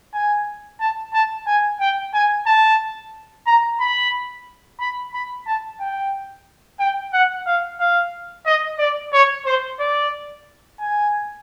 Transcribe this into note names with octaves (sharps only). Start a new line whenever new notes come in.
G#5
A5
A5
G#5
G5
G#5
A5
A#5
B5
B5
B5
A5
G5
G5
F#5
F5
F5
D#5
D5
C#5
C5
D5
G#5